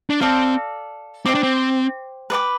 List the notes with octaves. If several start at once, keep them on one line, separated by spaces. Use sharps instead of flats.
D4
C4 A4 D5 F5
C4 C5 G5 D6
D4
C4
B4 D5 G5 D6